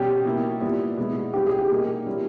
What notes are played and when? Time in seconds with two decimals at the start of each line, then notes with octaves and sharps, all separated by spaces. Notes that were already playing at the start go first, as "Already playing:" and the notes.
Already playing: B2 G3 C#4 G4
0.25 B2 A#3 E4
0.61 A#2 G3 B3 E4
0.97 B2 G#3 B3 E4
1.33 B2 G3 C#4 E4 G4
1.46 G#4
1.58 G4
1.69 B2 G3 A#3 D#4
2.06 A#2 G3 C#4 E4